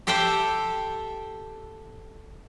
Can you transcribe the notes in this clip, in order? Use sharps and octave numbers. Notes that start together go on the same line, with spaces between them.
G4 A4 C5 E5 G5